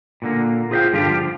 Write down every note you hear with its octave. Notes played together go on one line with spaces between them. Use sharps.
A#2 D3 A#3
F4 G#4 C5 E5 F5 G5
G2 D3 F4 G4
F3